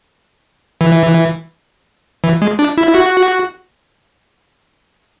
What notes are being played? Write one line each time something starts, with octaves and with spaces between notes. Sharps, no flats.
E3
E3
G#3
D4
E4
E4
F#4